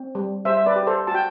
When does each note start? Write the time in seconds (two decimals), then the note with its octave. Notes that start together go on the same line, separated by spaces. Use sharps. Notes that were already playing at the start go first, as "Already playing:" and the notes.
Already playing: C4
0.15 G3
0.45 G3 C5 E5
0.57 E5
0.66 B4 D5
0.76 G4
0.87 A4 C5
1.07 F#4 A5
1.14 G5